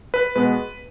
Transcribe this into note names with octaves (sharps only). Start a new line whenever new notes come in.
B4
B2 G#3 B3 B4